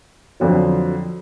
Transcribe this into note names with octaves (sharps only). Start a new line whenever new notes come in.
F2 D3 F#3